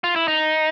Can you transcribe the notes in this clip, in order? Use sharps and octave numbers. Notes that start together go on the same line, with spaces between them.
F4
E4
D#4